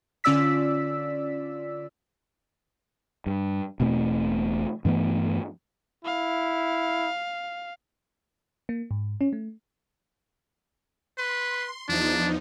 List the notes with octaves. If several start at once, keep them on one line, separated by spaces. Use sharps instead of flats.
D3 C#4 F4 D5 E6 B6
G2
E1 B2 A3 C4
G2 E3 A3 B3
E4 F5
A#3
G#2
C#4
A3
B4 C6
E2 F3 D4 D#4